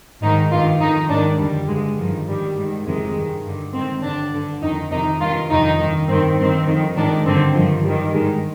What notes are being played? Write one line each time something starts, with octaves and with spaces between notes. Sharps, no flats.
G#2 D#3 D#4
G2 D#3 F4
F2 D#3 D#4
G#2 D#3 D4
F2 D3 G3
G2 D3 G#3
G2 D#3 F3
G#2 D#3 G3
G#2 D#3
F2 C3 D#3 G#3
G2 D#3
G2 D3
G#2 D#3 C4
G2 D3 D4
G2 D3
F2 D#3 D#4
F2 C3 D#3 D#4
G2 D#3 F4
F2 C3 D#3 D#4
G2 D#3
G2 D#3 C4
G2 D#3 C4
F2 D#3
G#2 D#3 D4
G2 D3 C4
G2 D#3 F3
G2 D#3 G3
G#2 D#3 G#3